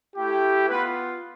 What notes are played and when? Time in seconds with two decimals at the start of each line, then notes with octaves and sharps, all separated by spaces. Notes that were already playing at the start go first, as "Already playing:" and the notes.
0.16 A3 E4 G4
0.69 B3 F4 B4